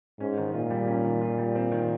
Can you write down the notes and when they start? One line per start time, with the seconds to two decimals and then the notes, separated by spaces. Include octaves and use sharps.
0.20 G#2 C#4
0.38 D#3
0.54 A#2 F4
0.70 G3
0.87 C#4
1.05 D#3
1.21 F4
1.38 G3
1.55 C4
1.72 D#3